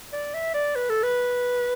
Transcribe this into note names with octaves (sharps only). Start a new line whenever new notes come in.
D5
E5
D5
B4
A4
B4